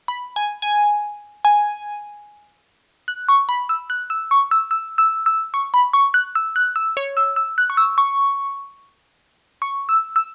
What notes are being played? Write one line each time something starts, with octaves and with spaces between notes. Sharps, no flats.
B5
G#5
G#5
G#5
F#6
C#6
B5
E6
F#6
E6
C#6
E6
E6
E6
E6
C#6
B5
C#6
F#6
E6
F#6
E6
C#5
E6
E6
F#6
C#6
E6
C#6
C#6
E6
E6